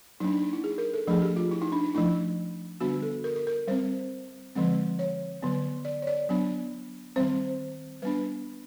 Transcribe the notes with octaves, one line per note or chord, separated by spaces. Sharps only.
F#3 A#3 D4 D#4
D4
D#4
E4
G#4
A#4
A4
F3 A3 D4 G#4
G4
F4
E4
D#4
D4
D#4
F3 A3 D4 E4
D3 G3 B3 D4 F#4
A4
A#4
A#4
A#4
G3 C4 C5
D3 F3 G#3 C4
C#5
D3 F#3 B3
D5
C#5
D5
F#3 B3 D4
D#3 G3 C4 C5
G3 B3 D4 B4